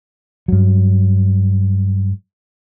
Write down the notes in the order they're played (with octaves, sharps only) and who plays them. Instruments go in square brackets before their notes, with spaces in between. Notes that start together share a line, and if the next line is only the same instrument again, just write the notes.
[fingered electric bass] G2 F#3